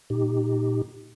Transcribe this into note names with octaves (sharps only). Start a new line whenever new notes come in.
A#2 D#4 G4